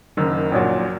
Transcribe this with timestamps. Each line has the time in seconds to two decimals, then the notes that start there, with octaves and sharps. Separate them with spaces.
0.17 F#1 F#2 D#3
0.52 A#1 A#2 F#3